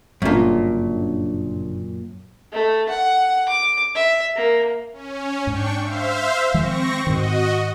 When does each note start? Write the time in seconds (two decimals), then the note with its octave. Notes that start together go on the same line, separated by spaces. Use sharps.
0.22 G1 F#2 A#2 C#3 D4
2.53 A3
2.89 F#5
3.49 D6
3.95 E5
4.36 A#3
4.93 C#4
5.47 G#2 D4 G5 C#6
5.82 C5 E5 F5
6.54 D#3 F3 G#3 C4 C#6 A#6
7.07 G#2 D#3 F#4 D#5